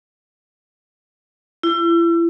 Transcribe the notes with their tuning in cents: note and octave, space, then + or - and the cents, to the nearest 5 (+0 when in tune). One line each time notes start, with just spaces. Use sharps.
E4 +35